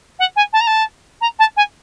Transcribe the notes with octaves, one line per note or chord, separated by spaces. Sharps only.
F#5
G#5
A5
A#5
A5
A#5
A5
G#5